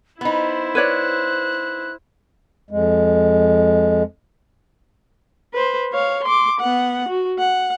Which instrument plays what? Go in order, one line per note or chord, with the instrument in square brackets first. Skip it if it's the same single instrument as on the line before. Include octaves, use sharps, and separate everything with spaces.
[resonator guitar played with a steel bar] B3 D#4 [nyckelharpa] E4 C5 [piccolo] B5
[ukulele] B4 C#5 D5 [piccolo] F#6
[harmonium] F2 G#3
[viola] B4 C5
C#5 F5
C6 D6
B3 F#5
F#4
F#5